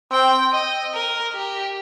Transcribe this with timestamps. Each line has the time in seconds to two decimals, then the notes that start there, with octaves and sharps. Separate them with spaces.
0.11 C4 G5
0.52 D#5
0.93 A#4
1.34 G4